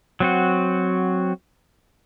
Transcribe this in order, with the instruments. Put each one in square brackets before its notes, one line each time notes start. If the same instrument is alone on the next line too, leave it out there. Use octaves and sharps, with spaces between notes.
[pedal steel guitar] F#3 C4 F#4